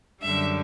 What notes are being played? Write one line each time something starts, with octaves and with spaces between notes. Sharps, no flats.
F#2 D3 G3 E5